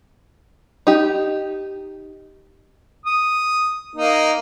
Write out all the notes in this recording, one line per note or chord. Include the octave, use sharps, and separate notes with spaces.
D#4 G4
D#6
A#3 D#4